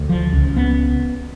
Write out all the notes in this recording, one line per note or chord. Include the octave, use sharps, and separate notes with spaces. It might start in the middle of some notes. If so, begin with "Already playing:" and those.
Already playing: D2
F3
C#2
B3